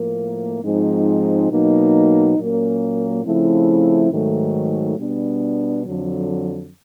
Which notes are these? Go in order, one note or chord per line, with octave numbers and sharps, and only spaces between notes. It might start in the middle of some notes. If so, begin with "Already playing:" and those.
Already playing: A2 F3 A#3
G#2 F3 G#3 C4 D#4
B2 F#3 A#3 D#4
A#2 F#3 A#3 C#4
C#3 F3 A3 C4 E4
G#2 D#3 F#3 A3
B2 G3 B3 D4
F2 D3 F#3